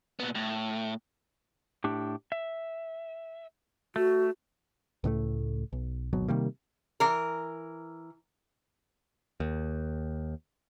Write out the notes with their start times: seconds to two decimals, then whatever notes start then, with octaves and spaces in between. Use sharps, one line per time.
0.20 A#2 B3
0.35 A2
1.84 A2 D4 G4
2.32 E5
3.96 A3 F#4
5.04 C#2 A2 G#3 A3
5.73 B1
6.13 D1 G#1 B2 F#3
6.28 C3 D#3 G3 A#3
7.00 E3 A#4
9.40 D#2